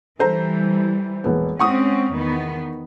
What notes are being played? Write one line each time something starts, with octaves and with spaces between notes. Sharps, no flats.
E3 G3 A4 C5 A#5
E1 A#1 B3
G#3 C4 C#4 F#5 C#6 D#6
E2 D#3 B3